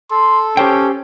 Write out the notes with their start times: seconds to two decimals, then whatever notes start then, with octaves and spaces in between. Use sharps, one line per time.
0.11 A4 C6
0.57 C#4 G4 C5 G5